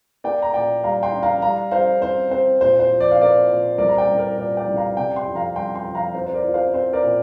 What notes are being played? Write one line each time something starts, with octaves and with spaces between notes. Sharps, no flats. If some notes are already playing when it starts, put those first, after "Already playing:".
A#3 D5 G5
A#5
A#2 D5 G5
G3 F5 A#5
G5 C6
D4
F5 A#5
G3 F5 A#5
G3 C5 F5
C4 C5
C4 C5
A#2 C5
C5
F3
D5
F5
C4 A#4 D5
A#2
C2 A#4 D5
A#5
D5 G5
C2
A#4 D5
A#2 A#4 D5
D5 G5
C2
F5 A#5
C3 D5 G5
G5 C6
F2
F5 A#5
G3 G5 C6
G5 C6
F2
F5 A#5
C4 C5
C5
A#4 D5
F4
C5 F5
C4 C5
A#4 D5
A#2